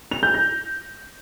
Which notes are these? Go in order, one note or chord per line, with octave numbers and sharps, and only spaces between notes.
F7
G6
A#6